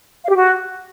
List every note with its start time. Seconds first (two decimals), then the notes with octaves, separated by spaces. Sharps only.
0.23 F5
0.29 G4
0.36 F#4